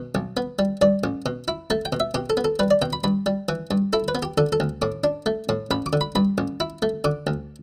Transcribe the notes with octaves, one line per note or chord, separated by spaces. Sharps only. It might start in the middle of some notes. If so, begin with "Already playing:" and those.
Already playing: B2
B1
B3
G3
G2 D5
A1
B2
E4
A3 A5
G5
B2
E5
B2 G4
A4
B3
A4
G3 B4
D5
B2 G5
B5
G2 B5
G3
E3
G2
E4 A4
B4
B3
G4
D3 A4
A4
D2
A2 D6
D4
A3
A2
A1 B5
D6
D3
B5
G2 B5
A1
E4
A3
D3 D6
D2